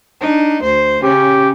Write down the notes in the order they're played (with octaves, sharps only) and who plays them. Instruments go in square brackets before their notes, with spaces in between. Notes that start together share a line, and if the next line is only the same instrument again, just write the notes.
[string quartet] D4 D#4
D2 C5
[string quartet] C#3 C#4 [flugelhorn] G4